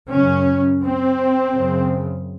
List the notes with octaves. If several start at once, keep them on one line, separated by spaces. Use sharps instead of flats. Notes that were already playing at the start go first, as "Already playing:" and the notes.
F#2 C#3 C#4
C4
F#2 C#3